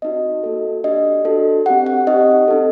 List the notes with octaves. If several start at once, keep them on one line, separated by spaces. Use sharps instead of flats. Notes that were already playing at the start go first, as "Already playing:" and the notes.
C4 D#4 F#4 D#5
A#3 F#4 A4
D4 G4 D#5
D4 F#4 A4
C4 G4 F#5
F#5
C4 D#4 G4 D#5
C4 D#4 A4